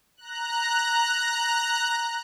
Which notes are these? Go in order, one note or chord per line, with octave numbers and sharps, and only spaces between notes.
A#5 F#6